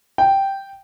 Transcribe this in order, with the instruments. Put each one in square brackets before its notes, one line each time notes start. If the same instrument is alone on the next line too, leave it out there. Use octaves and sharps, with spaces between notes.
[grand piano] G5